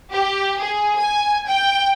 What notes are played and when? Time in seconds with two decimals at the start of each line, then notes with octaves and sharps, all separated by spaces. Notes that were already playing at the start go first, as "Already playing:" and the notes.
0.12 G4
0.60 G#4
0.97 G#5
1.46 G5